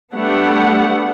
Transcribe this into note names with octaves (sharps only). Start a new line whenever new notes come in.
G3 A3 B3 D4 F#5